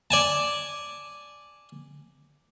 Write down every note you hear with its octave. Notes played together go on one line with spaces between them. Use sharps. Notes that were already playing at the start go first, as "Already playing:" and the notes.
D5 G#5 A5